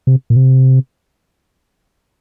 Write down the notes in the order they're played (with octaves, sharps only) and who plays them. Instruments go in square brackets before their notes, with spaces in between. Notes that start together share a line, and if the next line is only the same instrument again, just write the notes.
[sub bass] C3
A#2
C3